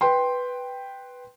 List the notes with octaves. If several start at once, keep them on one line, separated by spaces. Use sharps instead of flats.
B4 G5 C6